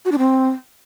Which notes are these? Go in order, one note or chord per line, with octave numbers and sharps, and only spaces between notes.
F#4
D4
C4